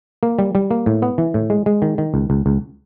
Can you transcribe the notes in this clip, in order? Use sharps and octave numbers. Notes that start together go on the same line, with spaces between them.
A#3
G3
G3
A#3
A2
B3
E3
A2
G#3
G#3
D#3
D#3
C#2
C#2
C#2